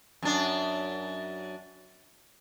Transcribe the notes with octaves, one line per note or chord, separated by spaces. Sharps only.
F#2 D4